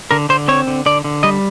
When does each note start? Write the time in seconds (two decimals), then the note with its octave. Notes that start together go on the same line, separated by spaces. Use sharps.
0.11 D3 A#4
0.29 D3 C5
0.48 C4 C#5
0.67 D3
0.86 D3 D5
1.04 D3
1.23 G3 D#5